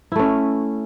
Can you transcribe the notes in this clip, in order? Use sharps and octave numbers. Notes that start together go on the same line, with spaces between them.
A3 C#4 E4